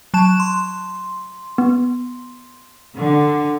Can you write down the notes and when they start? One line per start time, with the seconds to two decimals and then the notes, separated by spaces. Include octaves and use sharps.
0.14 F#3 A5 E7
0.40 C6
1.58 B3
2.96 D3